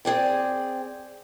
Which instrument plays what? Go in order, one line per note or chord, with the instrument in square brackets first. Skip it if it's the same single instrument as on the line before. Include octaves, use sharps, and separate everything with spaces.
[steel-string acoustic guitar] C4 G#4 D5 G5